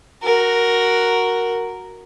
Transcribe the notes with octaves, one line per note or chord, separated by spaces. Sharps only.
F#4 A#4